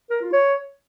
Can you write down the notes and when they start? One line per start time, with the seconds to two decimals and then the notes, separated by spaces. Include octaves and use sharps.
0.10 A#4
0.22 F4
0.33 C#5